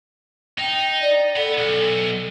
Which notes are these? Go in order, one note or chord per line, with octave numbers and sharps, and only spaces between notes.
D#4 G5
D5
A4 F#5 B5
B1